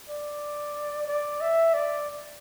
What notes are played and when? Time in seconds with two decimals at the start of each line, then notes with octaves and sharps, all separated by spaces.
0.09 D5
1.07 D5
1.41 E5
1.74 D5